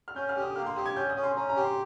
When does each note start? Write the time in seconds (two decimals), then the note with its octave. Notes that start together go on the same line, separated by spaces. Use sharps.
0.08 F6
0.16 C#4 G6
0.29 F6
0.36 G4
0.42 D#6
0.56 A#3 F6
0.66 C6
0.76 G4 D#6
0.86 G#6
0.96 C#4 G6
1.10 D#6
1.16 C#4
1.23 C6
1.36 C#4 A#5
1.49 A#5
1.56 G4
1.63 C6